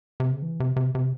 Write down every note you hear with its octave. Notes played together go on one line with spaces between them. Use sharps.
C3
C#3
E3
C3
C3
C3